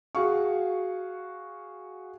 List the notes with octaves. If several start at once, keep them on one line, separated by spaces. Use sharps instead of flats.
F#4 G#4 F5 C#6